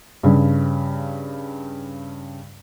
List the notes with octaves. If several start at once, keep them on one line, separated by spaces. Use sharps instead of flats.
G2 C#3